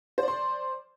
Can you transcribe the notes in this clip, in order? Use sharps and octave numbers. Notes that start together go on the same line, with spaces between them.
C5 D5 C6